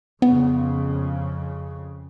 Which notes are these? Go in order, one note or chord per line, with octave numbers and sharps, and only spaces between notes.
F2 C#3 B3